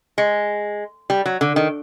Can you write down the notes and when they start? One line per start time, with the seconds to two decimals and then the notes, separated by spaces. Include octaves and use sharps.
0.18 G#3
1.10 G3
1.26 F#3
1.41 D3
1.56 D#3